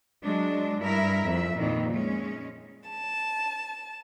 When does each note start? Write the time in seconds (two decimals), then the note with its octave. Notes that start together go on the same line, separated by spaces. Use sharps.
0.23 F#3 G#3 D4
0.80 G2 E4 A#4 E5
1.23 F2 E5
1.58 F2 A#2 D#3 E3
1.94 G#3 C#4
2.88 A5